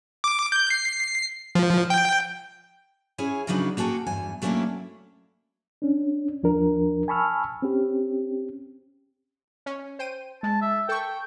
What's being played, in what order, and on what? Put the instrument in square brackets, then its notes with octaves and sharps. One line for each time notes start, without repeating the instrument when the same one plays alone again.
[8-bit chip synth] D6
G6
C7
F3
G5
[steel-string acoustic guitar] C#4 E4 G#4 C#5 G#5
C#3 F3 F#3 B3 D4 D#4
A#3 F#4 G#4 A4 G5
E2 G2 G#5
F#3 A3 A#3 C#4 D4 E4
[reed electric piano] C#4 D4
D#2 F3 D4 A#4
G#5 A5 B5 C#6 E6 F6
C4 C#4 G4
[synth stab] C#4
C5 G5 D#7
[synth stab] G#3 [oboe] A5
[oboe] E5
[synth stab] A4 C#6 [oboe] G5